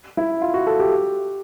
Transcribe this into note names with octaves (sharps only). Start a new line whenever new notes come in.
E4
F4
F#4
A4
G4